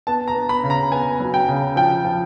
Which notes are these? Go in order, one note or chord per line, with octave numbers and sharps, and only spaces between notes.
B3 A5
A#5
B3
B5
C#3
A#5
B3 G#5
F#3
G5
C#3
F3 G5
F3